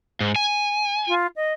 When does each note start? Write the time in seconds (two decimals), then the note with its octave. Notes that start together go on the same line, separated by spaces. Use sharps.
0.20 G#2
0.36 G#5
1.08 F4
1.36 D#5